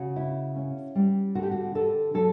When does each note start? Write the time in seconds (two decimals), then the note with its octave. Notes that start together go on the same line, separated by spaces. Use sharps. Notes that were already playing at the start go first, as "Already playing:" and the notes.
Already playing: C#3 F#4
0.16 E4
0.56 C#4
0.95 G3
1.35 D3 F#4
1.43 G4
1.51 F#4
1.75 D3 A4
2.14 F#3 A4